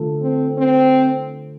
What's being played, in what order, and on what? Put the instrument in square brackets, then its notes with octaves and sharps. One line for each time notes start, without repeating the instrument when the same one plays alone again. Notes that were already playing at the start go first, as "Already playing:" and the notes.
Already playing: [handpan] D3 A3 F4 A4
[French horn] C4
C4